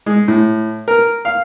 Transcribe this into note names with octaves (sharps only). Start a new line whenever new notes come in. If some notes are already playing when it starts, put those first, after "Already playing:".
G#3
A2
A#4
F5